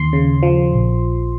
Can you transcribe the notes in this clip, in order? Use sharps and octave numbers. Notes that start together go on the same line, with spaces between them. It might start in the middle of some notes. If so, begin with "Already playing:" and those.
Already playing: D#2 C6
C#3
F3
A#1